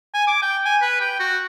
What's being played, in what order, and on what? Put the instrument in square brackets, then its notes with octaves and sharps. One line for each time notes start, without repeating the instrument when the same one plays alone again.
[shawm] G#5
D6
G5
G#5
B4
G5
F#4